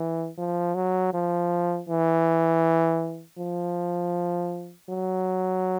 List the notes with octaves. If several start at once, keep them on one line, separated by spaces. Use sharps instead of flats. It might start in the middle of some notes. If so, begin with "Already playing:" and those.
Already playing: E3
F3
F#3
F3
E3
F3
F#3